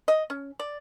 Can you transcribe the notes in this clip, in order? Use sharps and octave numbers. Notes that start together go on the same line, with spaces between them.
D#5
C#4
D5